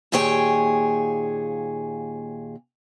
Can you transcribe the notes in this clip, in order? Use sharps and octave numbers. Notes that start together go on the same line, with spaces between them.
D#2 A#2 G#4 C#5 G5